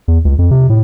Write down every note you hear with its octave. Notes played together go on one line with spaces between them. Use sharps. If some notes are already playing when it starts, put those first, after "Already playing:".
E2
C#2
F2
C3
A2